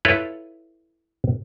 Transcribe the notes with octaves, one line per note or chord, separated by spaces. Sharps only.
E4 F4 A4 B4 C#5